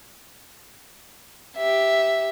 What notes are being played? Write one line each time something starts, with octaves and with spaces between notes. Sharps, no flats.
G4 E5